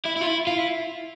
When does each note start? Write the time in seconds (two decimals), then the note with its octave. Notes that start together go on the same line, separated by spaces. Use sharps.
0.06 E4
0.17 E4
0.21 F4
0.27 E4
0.47 F4
0.58 E4